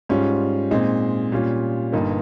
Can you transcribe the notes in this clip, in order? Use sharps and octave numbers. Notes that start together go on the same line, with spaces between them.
G#2 G3 C#4 F4
A#2 G#3 C4 D#4
A#2 G3 C#4 F4
G1 G2 G3 A#3 D#4